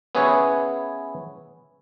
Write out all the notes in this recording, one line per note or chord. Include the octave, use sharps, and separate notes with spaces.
B3 C#4 E4 G#4 B4 C#5